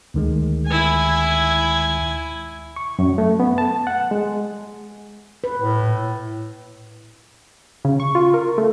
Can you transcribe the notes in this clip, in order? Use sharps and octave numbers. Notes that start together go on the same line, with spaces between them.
D2 D#3 G#3
E4 G#5
C#6
F#2
A3
B3
A5
F#5
G#3
B4
A2
A#2
C#3
C#6
F4
A#4
A3